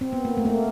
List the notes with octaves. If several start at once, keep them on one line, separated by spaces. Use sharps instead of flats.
C4
B3
A#3
A3
A#3
A3